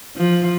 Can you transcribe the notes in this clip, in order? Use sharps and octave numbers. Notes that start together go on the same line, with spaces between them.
F3